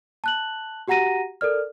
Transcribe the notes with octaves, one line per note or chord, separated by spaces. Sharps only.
A5 F#6 F#7
F#4 G4 F#5 A#5 A#6 D#7
A4 A#4 D5 F6